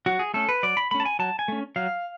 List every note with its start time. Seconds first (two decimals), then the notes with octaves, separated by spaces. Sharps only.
0.06 F#3 F#4
0.19 G#4
0.34 A3 C#4 A4
0.49 B4
0.63 F#3 D5
0.77 B5
0.91 A3 C#4 B5
1.00 A5
1.05 G#5
1.19 F#3 A5
1.39 G#5
1.48 A3 C#4
1.76 F#3 F5